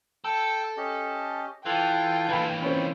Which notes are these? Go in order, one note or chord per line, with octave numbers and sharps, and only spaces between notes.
A4 G5 E6
C#4 G4 D#5
E3 F4 A4 F5 G5
E3 A#3 B4 G#5 B5
C4 C#4 F4 G5 B5